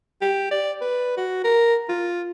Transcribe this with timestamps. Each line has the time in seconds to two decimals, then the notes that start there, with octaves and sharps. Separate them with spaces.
0.22 G4
0.51 D5
0.81 B4
1.17 F#4
1.44 A#4
1.89 F4